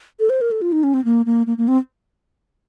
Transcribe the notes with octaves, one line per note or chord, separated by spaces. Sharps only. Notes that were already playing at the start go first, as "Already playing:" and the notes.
A4
C5
A#4
A4
F4
D#4
C#4
C4
A#3
A#3
A#3
A#3
C4